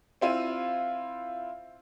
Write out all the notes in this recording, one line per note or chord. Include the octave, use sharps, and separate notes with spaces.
C4 E4 F4 D#7